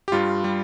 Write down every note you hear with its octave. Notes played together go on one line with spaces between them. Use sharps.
G4
G2 G3 F4
G3